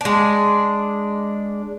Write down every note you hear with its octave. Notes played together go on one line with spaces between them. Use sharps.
G#3 D4